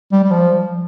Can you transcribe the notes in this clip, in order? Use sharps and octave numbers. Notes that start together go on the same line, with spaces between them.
G3
G3
F3